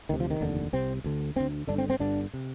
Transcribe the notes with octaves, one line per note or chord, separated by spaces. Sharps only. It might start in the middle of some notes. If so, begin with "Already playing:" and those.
D2 C3 D#3
F3
D#3
F1 D#2 D3
C2 C3 C4
D2 D3
D2 D3 C4
G1 G2 D3 D4
C4
C4
G1 G2 D3 D4
C3